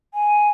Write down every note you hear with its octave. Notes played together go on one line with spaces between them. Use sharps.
G#5